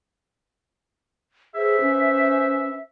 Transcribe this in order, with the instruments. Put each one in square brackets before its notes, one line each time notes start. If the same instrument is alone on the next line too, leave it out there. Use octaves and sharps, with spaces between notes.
[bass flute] G#4 [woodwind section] B4 C5 E5
[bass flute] C#4